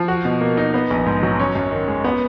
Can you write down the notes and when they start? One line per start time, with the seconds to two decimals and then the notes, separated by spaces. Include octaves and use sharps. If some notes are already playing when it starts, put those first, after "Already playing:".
Already playing: F3
0.08 F#4
0.25 B2
0.41 A#3
0.57 D#4
0.74 B3
0.90 A#1
1.06 G#2
1.23 F#3
1.39 C#4
1.55 F#2
1.71 D#3
1.88 G#3
2.04 B3